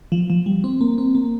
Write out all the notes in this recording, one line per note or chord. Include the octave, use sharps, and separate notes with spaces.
F3
F3
G3
C4
A#3
C4
A#3